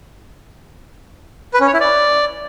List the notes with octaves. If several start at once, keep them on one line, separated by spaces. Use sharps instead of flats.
B4
C#4
C#5
E4
D5